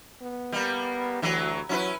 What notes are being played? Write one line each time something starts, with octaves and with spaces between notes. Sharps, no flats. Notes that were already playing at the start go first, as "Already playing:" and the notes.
B3
G3 A#3
D2 E3 F#3
F#3 C#4 E4 B4